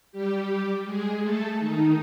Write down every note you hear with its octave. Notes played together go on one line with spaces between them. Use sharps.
G3 G4
G#3 G#4
A3 A4
D#3 D#4